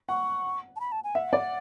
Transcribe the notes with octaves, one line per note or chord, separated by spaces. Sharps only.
F#5 C#6
A5
B5
A5
G#5
E5 F#5
D5